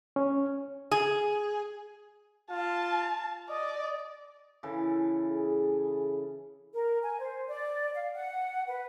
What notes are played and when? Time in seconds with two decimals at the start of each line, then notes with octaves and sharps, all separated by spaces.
0.16 C#4
0.91 G#4
2.51 F4 A5
3.50 D5 D#5
4.63 C#3 E3 A4
5.31 G#4
6.73 A#4
7.03 G#5
7.20 C5
7.48 D5
7.95 F5
8.15 F#5
8.68 B4